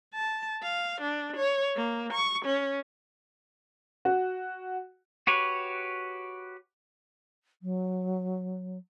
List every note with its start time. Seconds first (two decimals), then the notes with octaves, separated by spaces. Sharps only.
0.14 A5
0.62 F5
1.01 D4
1.37 C#5
1.76 A#3
2.13 C#6
2.45 C#4
4.05 F#4
5.27 F#4 G4 B4 C#5
7.62 F#3